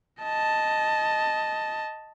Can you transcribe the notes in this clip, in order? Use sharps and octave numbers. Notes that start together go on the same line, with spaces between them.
D#5 A5